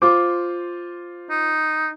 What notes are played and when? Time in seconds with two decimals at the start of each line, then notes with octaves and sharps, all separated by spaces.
0.02 F4 C5 D6
1.30 D#4